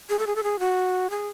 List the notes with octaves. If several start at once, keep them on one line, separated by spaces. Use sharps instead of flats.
G#4
A4
G#4
A4
G#4
F#4
G#4